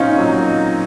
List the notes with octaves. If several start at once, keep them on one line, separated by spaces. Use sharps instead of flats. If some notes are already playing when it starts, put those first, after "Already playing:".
Already playing: A#2 F#3 C4 C#4 D#4 F4
A#2 F#3